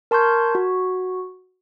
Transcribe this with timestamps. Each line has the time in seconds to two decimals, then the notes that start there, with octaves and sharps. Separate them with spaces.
0.11 A#4 A5 C6 C#6 G6 G#6
0.55 F#4